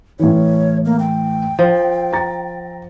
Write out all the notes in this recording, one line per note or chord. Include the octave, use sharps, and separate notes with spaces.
A2 E3 C#5
A#3
G5
F3
A#5 A6